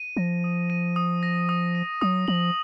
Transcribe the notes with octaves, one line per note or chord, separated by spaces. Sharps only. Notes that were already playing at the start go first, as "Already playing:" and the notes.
Already playing: D#7
F3 A#6
D#6
D#7
D#6
A#6
D#6
D#7
F#3 D#6
F3 F#7